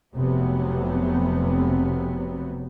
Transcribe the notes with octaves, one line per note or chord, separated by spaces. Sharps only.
F1 C3 F#3 B3